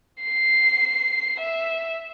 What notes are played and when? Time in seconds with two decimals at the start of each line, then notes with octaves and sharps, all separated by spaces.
0.23 C7
1.40 E5